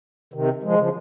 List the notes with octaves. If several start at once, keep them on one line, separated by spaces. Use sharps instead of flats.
C3 D#3
F3 G#3
C#3 F3